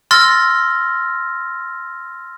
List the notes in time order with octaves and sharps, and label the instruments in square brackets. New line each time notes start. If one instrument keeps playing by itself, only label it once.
[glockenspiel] C6 E6 F6 A6 A#6